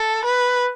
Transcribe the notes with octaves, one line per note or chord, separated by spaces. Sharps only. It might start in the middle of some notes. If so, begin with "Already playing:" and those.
Already playing: A4
B4